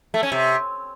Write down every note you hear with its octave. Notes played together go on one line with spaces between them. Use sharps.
A3
C#4
C3